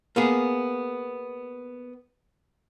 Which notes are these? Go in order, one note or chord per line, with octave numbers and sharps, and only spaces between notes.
A#3 B3 G#4